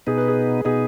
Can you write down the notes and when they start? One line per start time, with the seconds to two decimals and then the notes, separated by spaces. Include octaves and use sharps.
0.07 B2 B3 D#4 G#4
0.18 B4
0.28 G#4
0.65 B2 B3 D#4 G#4